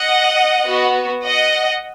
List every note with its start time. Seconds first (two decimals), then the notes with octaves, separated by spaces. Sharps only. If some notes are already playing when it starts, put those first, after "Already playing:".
Already playing: D#5 F#5
0.66 B3 F#4
1.26 D#5 F#5